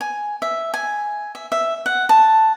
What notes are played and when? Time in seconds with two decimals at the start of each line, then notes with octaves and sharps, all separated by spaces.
0.01 G#5
0.42 E5
0.74 G#5
1.35 E5
1.52 E5
1.86 F#5
2.09 A5